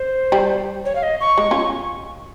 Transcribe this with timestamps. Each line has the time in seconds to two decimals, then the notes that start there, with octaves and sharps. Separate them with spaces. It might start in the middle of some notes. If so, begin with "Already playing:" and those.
Already playing: C5
0.32 G3
0.85 C#5
0.96 F5
1.03 D#5
1.21 C#6
1.38 G#3
1.51 C#4 F4